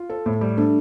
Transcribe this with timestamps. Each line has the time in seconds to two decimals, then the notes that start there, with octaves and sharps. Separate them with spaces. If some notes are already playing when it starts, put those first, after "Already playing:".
Already playing: F4
0.10 A4
0.26 A2
0.41 G3
0.57 A3 D4